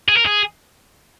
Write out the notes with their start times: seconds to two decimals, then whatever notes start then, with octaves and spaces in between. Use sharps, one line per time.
0.09 G#4
0.17 A#4
0.26 G#4